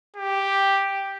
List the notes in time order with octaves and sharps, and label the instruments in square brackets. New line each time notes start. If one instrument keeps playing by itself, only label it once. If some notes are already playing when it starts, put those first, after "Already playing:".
[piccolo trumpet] G4